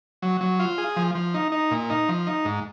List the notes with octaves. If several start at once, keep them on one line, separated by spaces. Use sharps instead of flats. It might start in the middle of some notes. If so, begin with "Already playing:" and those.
F#3
F#3
F4
G#4
F3
F3
D#4
D#4
A#2
D#4
F3
D#4
G#2